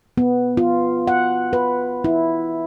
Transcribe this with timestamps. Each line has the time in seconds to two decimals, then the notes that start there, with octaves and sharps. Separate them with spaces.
0.18 B3
0.57 F4
1.08 F#5
1.53 B4
2.04 E4